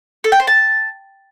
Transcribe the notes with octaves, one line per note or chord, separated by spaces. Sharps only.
A4
G5
C5
A5